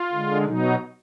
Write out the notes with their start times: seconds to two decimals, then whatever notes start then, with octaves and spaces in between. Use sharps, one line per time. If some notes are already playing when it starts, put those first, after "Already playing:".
Already playing: F4
0.12 D3 G#3
0.45 B2 F#3 D#4